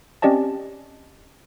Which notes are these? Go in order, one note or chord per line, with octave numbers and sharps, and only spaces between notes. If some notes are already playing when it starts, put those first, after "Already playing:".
C4 C#4 G4 D5 D#5 A5